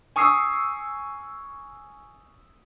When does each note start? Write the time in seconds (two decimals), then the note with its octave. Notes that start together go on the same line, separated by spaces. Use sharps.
0.16 G#5 C#6 D#6 E6 C7